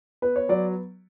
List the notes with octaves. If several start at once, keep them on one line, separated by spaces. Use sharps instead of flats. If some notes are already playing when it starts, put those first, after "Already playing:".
B3 B4
C#5
F#3 D5